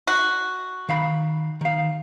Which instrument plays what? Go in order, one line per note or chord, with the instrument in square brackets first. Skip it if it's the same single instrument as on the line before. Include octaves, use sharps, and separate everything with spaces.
[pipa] F#4
[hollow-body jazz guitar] D#3 F5 B5
D#3 F5